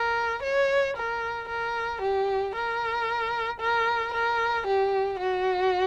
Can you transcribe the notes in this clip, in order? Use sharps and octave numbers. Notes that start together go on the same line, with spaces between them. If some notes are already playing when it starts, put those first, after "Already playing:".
Already playing: A#4
C#5
A#4
A#4
G4
A#4
A#4
A#4
G4
F#4